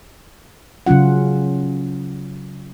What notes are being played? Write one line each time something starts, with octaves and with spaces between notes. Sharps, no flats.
C#3 F#3 C#4 F4 F#5